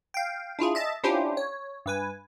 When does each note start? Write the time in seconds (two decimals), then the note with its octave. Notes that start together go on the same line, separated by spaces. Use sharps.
0.14 F5 G5
0.59 D4 E4 F4 G#4
0.75 D#5 E5 A5 A6
1.04 C#4 D4 E4 F4 G4 C5
1.37 C#5
1.86 G2 B4 G#5